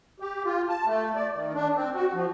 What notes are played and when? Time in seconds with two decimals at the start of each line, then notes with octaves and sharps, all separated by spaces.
0.20 G4
0.45 F4
0.69 A5
0.86 A3
1.15 D5
1.34 D#3
1.54 D4
1.76 C4
1.95 F#4
2.13 F3